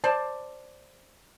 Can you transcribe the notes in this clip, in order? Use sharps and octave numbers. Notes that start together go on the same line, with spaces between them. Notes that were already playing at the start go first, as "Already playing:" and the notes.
C5 D5 A5